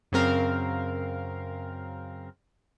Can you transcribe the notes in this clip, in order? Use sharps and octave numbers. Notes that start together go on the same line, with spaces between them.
F#2 C#3 C4 A#4 F5